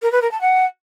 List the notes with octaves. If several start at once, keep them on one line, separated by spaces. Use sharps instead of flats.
A#4
B4
A#4
A5
F#5